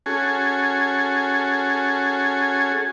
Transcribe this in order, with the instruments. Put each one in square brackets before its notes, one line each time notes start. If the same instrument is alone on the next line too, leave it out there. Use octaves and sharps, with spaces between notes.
[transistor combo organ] C#4 F#4 G#4 A4 G#5